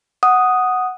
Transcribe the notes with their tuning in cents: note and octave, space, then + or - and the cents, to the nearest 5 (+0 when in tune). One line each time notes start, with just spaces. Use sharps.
F#5 +0 D#6 +0